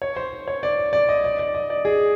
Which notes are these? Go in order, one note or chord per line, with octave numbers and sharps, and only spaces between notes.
C#5
C5
C#5
D5
D5
D#5
D5
D5
D#5
D5
G#4